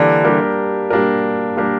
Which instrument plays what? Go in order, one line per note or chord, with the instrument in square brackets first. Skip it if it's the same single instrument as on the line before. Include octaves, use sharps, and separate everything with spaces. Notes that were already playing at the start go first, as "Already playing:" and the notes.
Already playing: [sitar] D3 E3 [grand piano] G3 A#3 D4 G4 A#4
[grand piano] G3 A#3 D4 G4 A#4
G3 A#3 D4 G4 A#4
G3 A#3 D4 G4 A#4